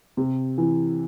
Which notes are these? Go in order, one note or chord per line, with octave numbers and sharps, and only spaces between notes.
C3
E3